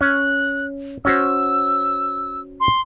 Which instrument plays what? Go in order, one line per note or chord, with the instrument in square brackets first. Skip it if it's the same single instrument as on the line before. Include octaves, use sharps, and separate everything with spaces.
[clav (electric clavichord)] C#4 [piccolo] F#6
[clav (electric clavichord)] C#4 F#4 C5 [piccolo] E6
[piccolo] C6